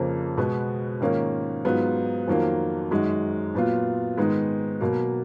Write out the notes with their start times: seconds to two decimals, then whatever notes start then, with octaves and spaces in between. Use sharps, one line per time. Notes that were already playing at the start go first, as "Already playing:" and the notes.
Already playing: F2 C#3 F3 A#3
0.37 B2 G#3 B3 F#4
1.00 G#2 D#3 A#3 C#4 F4
1.65 G#2 F#3 B3 F4
2.27 F2 D#3 F#3 A#3 F4
2.91 F#2 D#3 G#3 D#4 F#4
3.55 A#2 F#3 B3 F4
4.17 G#2 D#3 G#3 B3 D#4
4.81 B2 F#3 A#3